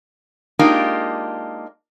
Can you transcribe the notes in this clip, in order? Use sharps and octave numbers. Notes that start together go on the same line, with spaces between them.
G#3 A#3 D4 D#4 F4 G4